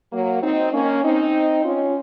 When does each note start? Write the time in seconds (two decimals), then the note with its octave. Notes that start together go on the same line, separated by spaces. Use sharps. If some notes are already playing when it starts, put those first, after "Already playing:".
0.13 F#3 A#3
0.43 C4 D#4
0.73 A#3 C#4
1.04 C4 D#4
1.64 C#4 F4